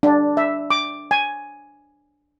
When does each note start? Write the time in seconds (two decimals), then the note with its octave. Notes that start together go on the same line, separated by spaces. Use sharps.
0.03 D4
0.37 E5
0.71 D6
1.11 G#5